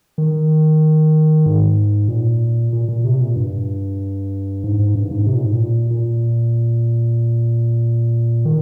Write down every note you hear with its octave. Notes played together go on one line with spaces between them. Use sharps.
D#3
G#2
A#2
A#2
A#2
C3
A#2
G2
G#2
G#2
G2
G#2
C3
A#2
G#2
A#2
A#2
D#3